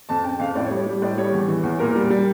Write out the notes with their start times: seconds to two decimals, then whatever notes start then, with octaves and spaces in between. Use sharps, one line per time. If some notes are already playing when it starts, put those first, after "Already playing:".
0.09 F2 A5
0.24 C#3 G5
0.40 F2 F5
0.55 A2 D5
0.66 C#5
0.71 G3
0.77 C#5
0.87 G3
1.02 A2 D5
1.18 G3 C#5
1.33 E2
1.48 E3
1.63 E2
1.79 A#2 A#4
1.95 G3
2.10 G3